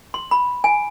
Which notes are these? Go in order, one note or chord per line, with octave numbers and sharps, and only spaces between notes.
C6
B5
G#5